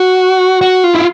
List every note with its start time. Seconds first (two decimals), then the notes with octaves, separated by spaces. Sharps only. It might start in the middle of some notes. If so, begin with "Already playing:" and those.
Already playing: F#4
0.61 F#4
0.84 F4
0.95 E4